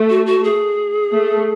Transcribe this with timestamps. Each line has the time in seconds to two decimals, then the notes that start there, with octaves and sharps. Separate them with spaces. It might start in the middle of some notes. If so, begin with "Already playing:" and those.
Already playing: A3
0.09 F#4
0.26 F#4
0.43 G#4
1.13 A3